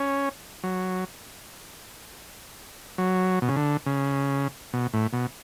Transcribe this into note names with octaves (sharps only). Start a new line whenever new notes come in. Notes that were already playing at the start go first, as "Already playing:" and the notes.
Already playing: C#4
F#3
F#3
B2
C#3
D3
C#3
B2
A2
B2